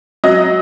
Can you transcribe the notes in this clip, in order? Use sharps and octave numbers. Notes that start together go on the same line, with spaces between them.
F#3 D#5